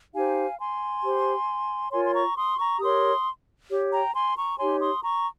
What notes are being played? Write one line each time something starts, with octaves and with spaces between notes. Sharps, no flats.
D#4 G4 C5 F5 G#5
G#5 C6
G4 C5
F4 A#4 C#5 G#5 C6
C6
A#5 C#6
C6 D#6
A#5 C#6
G4 A#4 C#5 C6 D#6
G4 C#5
G5 A#5
G#5 C6
A#5 C#6
D#4 G4 C#5 G#5 C6
C6 D#6
A#5 C#6